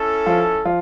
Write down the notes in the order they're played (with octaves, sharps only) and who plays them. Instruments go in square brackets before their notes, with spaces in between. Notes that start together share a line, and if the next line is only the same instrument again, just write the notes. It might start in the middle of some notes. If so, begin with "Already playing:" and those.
Already playing: [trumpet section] C#4 E4 A4
[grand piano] F3 F4
F3 F4